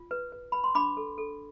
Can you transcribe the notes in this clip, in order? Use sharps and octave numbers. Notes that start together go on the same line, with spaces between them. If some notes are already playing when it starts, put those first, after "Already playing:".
Already playing: F4
B4
B4
B4 B5
C6
D4 B5 D6
A4
A4